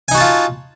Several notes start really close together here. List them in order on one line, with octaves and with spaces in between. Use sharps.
G#5 D#4 F#4 A5 F4